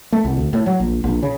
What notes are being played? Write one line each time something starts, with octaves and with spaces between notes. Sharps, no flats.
A3
C2
D2
A2
F#3
A#1
A#1
C#3